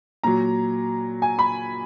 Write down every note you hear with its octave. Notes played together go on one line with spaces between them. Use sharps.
A#2 F#3 A#5
G#5
B5